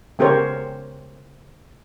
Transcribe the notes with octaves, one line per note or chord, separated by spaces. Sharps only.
C#3 B3 G4 A#4 C5 C#5